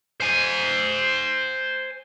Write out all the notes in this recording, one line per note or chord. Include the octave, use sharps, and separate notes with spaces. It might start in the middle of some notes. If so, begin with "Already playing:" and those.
C5 G#5